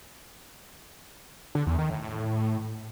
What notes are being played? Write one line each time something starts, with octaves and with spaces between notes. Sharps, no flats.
D3
E2
D#3
A2
A2